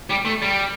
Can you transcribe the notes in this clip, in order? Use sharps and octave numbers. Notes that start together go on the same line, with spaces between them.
G3
A3
G3